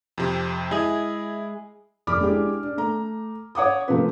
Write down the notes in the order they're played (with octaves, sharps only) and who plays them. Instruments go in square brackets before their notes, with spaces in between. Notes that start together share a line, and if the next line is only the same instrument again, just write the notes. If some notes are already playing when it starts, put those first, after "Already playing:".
[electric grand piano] F2 C3
[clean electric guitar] G#3 G#4 [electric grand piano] E4
[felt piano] F1 D5 B5 D6 F6
G#3 D4 E4 G4 G#4
D4
A3 A#5
C#5 F#5 D6 D#6
C3 F3 A3 A#3 C4 B4